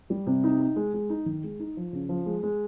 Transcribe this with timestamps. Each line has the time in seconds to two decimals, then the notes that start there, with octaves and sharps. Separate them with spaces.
0.10 G3
0.26 C3
0.44 D#4
0.60 D#4
0.76 G#3
0.94 G#3
1.10 D#4
1.26 D#3
1.44 G#3
1.60 D#4
1.77 F3
1.93 C#3
2.09 F3
2.26 G#3
2.43 G#3